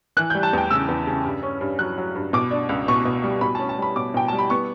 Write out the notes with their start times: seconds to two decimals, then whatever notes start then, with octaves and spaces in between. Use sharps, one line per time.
0.17 E3 F#6
0.30 G3 G6
0.43 A5
0.53 E2 G5
0.70 C#3 E6
0.88 E2
1.07 C#3
1.24 G2
1.43 C#4
1.61 G2
1.79 F#3 F#6
1.98 F#3
2.15 G2
2.33 B2 D6
2.51 D4
2.69 C#2
2.88 B2 C#6
3.05 B2
3.24 G3
3.41 B2 B5
3.55 C#4 A5
3.69 A5
3.78 G3 B5
3.96 B2 D6
4.14 B2 G5
4.28 G3 A5
4.39 B5
4.50 B3 C#6